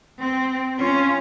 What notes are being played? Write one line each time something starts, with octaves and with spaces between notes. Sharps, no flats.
C4
C#4 F4